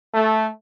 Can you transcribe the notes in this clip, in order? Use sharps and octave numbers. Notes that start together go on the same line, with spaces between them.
A3